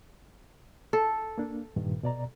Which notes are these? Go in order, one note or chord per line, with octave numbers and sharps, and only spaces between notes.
A4
A#3 D4
G2 A#2 D#3
B2 D5 A#5